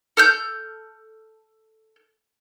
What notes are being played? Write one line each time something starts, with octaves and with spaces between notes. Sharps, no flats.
A4 F6 G6